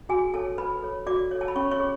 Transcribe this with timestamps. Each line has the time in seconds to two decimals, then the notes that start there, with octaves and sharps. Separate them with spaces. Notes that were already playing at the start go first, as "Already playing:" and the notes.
0.09 F#4 G#4 G#5
0.34 A4 C#5 A5
0.58 F#4 B4 B5
0.82 A4 C#5
1.06 F#4 D5 D6
1.31 A4 C#5
1.41 A5
1.48 B5
1.56 C#4 C#5 C#6
1.71 C#5 C#6
1.80 G#4